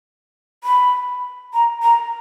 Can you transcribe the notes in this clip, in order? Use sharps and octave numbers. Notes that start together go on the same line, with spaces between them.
B5
A#5
A#5